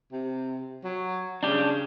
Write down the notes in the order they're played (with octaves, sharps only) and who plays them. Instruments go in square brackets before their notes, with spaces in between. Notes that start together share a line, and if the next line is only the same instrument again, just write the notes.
[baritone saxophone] C3
F#3
[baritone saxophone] C#3 [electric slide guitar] D4 G4